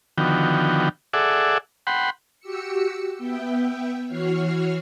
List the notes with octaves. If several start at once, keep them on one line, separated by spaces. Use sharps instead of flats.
D3 D#3 F3 B3 F#4 G5
G#4 A4 D5 E5 F#5
F#5 G5 B5 C6
F#4 G4 E6 C#7
B3 E5 G5
E3 F#4 C#5 F6 C7